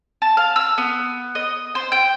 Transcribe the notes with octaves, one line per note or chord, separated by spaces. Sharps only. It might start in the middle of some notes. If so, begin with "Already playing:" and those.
A5
F5
E6
B3
D#5
C5
G5